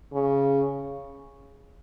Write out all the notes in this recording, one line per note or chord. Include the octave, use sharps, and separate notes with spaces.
C#3